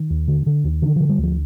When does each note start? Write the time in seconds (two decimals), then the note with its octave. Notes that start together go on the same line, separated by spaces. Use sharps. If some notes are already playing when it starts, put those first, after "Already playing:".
Already playing: D#3
0.10 D#2
0.28 D3
0.46 D3
0.64 D#2
0.82 D3 D#3
0.96 D3 F3
1.09 G3
1.18 D2 F3